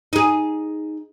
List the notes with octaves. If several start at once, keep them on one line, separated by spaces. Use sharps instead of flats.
D#4 G#4